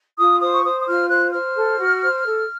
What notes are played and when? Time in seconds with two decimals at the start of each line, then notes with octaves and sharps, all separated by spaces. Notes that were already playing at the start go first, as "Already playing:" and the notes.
0.17 F4 D#6
0.40 C5 D#6
0.53 C#6
0.64 C5 D#6
0.80 D#6
0.86 F4 F6
1.09 C5 F#6
1.32 C5 F6
1.56 A4
1.78 F#4
2.02 C5
2.25 A4